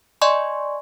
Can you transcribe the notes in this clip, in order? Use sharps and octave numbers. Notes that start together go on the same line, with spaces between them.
D5 D#5 G#5 C6 C#6